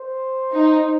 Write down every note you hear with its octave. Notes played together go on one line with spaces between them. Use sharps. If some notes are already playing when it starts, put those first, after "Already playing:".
Already playing: C5
D#4